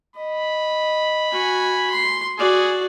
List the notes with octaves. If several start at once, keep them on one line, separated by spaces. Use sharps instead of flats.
D#5 B5
F#4 G#5
C6
F#4 G#4 D5